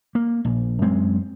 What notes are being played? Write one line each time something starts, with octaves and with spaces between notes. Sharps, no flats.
A#3
A#1
F#2 G#3 C4